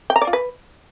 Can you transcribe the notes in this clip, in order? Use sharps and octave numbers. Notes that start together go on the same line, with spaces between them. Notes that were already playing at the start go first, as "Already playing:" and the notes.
G5
A#5
D5
F4
B4